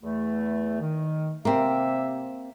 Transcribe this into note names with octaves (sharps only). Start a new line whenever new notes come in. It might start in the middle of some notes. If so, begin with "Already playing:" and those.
E2 A3
D#3
C3 A#3 C4 E5